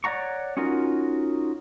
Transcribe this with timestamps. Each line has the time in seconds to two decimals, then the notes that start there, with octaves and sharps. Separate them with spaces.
0.04 C#5 D5 F#5 A#5 C#6
0.57 C#4 D#4 F4 F#4 A#4